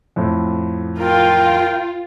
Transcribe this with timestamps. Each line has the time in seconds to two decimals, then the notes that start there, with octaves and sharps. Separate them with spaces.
0.16 F2 A2
1.00 F4 A#4 G5